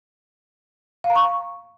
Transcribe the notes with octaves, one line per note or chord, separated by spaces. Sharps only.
F5
A#5
C#6